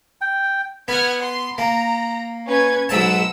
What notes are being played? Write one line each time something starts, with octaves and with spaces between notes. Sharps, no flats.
G5
B3 F#5 F6 G#6
C6
A#3 A#5
C#4 B4 G#6
B1 G#2 F#5 A5 E6